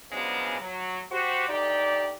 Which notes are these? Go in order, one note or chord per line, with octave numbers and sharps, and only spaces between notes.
C#3 F3 F#3 G#3 B3 D4
F#3
F#4 G4 C5
D2 D#4 G4 D5